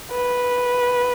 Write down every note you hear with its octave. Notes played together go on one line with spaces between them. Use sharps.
B4